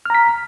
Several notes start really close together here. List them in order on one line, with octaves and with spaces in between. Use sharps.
F6 A#5 B6